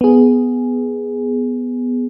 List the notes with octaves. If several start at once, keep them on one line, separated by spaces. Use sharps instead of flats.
B3 G#4